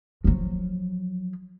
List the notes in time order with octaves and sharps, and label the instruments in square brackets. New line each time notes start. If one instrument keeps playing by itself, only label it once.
[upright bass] F3 F#3